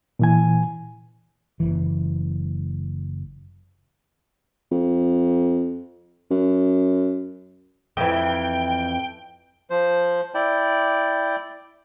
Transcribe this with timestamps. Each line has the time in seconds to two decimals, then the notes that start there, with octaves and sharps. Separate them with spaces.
0.19 A#2 E3 G#5
1.60 F#1 E3
4.72 F2
6.31 F#2
7.97 F2 E3 G5
9.70 F3 C5
10.35 E4 D5 G5